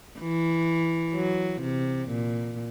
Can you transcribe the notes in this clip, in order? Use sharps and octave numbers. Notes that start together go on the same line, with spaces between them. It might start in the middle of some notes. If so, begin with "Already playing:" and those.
E3
F#3
C3
A#2